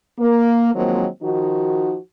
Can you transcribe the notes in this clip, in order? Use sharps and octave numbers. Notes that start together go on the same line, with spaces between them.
A#3
D#3 F3 F#3 G#3 A#3 C4
D#3 F3 D#4 F#4